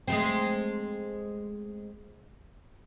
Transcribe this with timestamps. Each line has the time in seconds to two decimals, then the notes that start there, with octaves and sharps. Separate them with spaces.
0.08 G#3 A3 C4